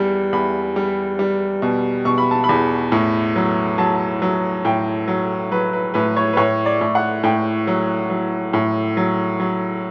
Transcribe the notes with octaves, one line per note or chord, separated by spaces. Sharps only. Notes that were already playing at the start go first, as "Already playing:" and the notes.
Already playing: E2 G3
E2 B5
G3
G3
B2
B2 C#6
B5
A5
B5
E2
A2
F#3
F#3 A5
F#3
A2 G5
F#3
F#3 B4
B4
A2 B4
C#5
B4
A2 C#5
D5
A2
F#5
A2 G5
F#3
F#3
A2
F#3
F#3